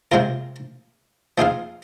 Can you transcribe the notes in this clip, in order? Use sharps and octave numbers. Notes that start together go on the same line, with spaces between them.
C3 G#3 C4 F4 A#4
F3 C4 D#4 G#4 F5